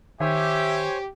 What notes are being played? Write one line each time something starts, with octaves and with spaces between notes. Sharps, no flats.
D#3 G4 C5 C#5 E5 G#5